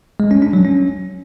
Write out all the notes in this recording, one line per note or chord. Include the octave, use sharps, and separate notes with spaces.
G#3
C#4
D4
F#3
C#4